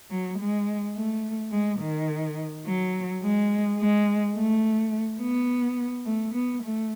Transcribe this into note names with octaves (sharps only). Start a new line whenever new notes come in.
F#3
G#3
A3
G#3
D#3
F#3
G#3
G#3
A3
B3
A3
B3
A3